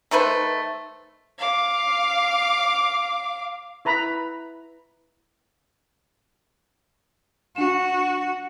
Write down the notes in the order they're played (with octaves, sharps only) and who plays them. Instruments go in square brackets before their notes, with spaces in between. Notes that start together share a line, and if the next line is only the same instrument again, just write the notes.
[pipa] D#3 A3 B4 C5
[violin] F5 D6
[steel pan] E4 B4 A#5 B5
[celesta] D4 E7 [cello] F#4